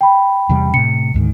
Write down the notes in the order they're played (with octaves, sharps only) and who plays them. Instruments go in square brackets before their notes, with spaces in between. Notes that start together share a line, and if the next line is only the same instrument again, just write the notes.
[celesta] G5 B5
[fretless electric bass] E2 C3 G3
[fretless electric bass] A2 C3 [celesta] C#7
[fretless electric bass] D2 G#2 D#3